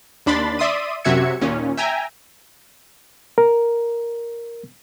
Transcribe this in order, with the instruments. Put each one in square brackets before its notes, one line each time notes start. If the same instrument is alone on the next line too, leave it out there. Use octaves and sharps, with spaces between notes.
[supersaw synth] D#2 D4 B5 C6 A6
D5 E5 C6 D#6 D#7
F#2 C3 F#4 E5 G#6 C#7
D#2 A#2 C#4
E5 G5 G#5 A#5
[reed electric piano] A#4